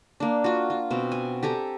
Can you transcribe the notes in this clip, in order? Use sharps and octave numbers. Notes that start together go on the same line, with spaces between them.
A#3 D4
F4 F#4
F4
B2 C4
G#5
G4 A4 G#5 A#5